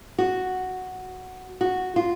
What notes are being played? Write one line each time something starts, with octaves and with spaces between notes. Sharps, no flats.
F#4
F#4
F4